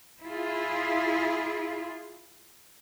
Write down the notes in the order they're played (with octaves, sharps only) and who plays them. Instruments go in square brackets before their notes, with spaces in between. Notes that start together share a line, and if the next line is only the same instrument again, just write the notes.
[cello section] E4 F4 G#4